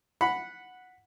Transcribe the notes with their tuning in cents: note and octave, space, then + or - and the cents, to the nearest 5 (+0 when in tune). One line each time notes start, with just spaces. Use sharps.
F#5 -10 B5 +0